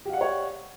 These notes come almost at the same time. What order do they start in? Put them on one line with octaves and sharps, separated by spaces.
G4 F5 F#5 D5 C#5